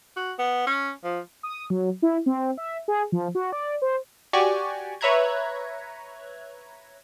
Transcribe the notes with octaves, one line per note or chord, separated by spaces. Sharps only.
F#4
B3
C#4
F3
D#6
F#3
E4
C4
E5
G#4
F3
F#4
D5
C5
F#4 G4 D5 G#5 C#6
B4 C#5 E5 A#5 F#6 G#6